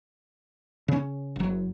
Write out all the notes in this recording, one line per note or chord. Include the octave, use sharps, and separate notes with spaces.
C#3 C#4
F#1 F#3